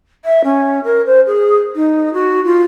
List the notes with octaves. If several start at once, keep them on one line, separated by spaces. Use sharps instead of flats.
E5
C#4
A#4
C5
G#4
D#4
F#4
F4